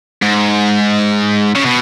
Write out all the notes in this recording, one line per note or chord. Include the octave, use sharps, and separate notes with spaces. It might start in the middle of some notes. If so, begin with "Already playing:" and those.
G#2
C#3
B2